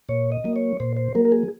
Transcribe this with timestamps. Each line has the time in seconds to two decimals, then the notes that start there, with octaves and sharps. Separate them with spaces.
0.09 A#2 C#5
0.32 D#5
0.44 F#3 A#3
0.56 C#5
0.80 A#2 C5
0.97 C5
1.15 F#3 A#3 A#4
1.25 A#4
1.32 G#4